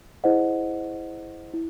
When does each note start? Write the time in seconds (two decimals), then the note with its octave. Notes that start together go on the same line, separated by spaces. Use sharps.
0.24 E4 G#4 C5 D#5 F#5
1.54 E4